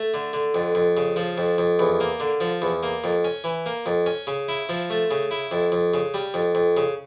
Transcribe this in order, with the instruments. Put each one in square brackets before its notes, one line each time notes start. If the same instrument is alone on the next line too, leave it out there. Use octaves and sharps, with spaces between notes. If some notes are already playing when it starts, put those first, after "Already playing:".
Already playing: [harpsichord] A3
D3
D3
F2
F2
C#3
F3
F2
F2
E2
A#3
D3
F3
E2
A#3
F2
C#4
E3
A#3
F2
C#4
C#3
E4
F3
A3
C#3
E4
F2
F2
C#3
G3
F2
F2
C#3